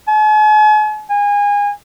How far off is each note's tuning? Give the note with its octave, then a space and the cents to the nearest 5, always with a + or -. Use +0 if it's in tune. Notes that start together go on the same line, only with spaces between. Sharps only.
G#5 +45
G#5 -25